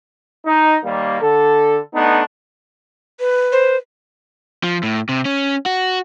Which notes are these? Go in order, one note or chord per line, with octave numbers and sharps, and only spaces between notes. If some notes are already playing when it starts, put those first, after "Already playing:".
D#4
D#2 G3 A#3
D3 A4
A3 B3 D4 D#4
B4
C5
F3
A2
C3
C#4
F#4